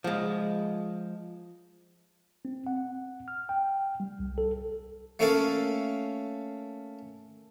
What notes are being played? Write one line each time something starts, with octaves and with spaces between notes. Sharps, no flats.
F3 G#3
C4
F#5
F6
G5
G3
C2
A4
A3 A#3 C#4 A4 C#5 F5